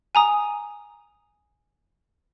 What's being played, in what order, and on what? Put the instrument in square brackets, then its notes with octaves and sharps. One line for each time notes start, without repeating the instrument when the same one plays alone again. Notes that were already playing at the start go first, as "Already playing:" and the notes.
[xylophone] G#5 A#5 D#6